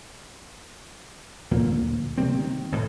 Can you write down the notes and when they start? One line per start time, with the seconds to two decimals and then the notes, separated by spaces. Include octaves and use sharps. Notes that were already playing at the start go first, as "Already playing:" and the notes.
1.51 D2 A#2 F3 A#3
2.18 C3 G3 A#3 C4
2.40 D#3
2.72 A1 A2